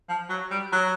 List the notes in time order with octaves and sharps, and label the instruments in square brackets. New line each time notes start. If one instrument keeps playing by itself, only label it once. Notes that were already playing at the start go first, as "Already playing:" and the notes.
[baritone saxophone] F3
F#3
G3
F#3